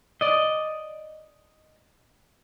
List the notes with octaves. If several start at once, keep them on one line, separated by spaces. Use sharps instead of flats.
D5 D#5